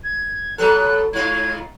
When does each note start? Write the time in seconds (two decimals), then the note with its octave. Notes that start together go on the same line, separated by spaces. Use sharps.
0.04 G#6
0.58 F#3 B3 A4 F#6
1.13 G#2 F4 G#6